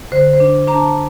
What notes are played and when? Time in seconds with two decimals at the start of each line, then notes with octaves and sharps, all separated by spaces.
0.12 D3 C5
0.33 C5
0.40 D4
0.67 D4 A#5
0.74 A5